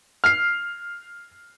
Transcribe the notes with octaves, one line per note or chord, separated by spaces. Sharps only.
F6 C7